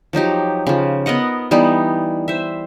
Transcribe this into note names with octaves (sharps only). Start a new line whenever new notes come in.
F3 F#3 D#4 G4
C#3 F3
B3 A#4 D#5 F#5
E3 G3 B3 D#4
C5 E5